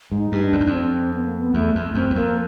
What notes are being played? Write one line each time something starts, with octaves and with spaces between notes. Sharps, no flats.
G#2
D#4
G2
D4
F2
F#2
F2
C4
B3
A#3
B3
E2 A3
F2 A3
F#2 C4
E2
F2 A#3